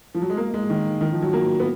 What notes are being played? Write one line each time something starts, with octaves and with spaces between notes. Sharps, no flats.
F3
F#3
G#3
A#3
G#3
D#3
D#3
F3
F#3
A#3
B3